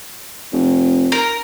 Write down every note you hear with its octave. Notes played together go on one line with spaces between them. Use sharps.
F1
A#4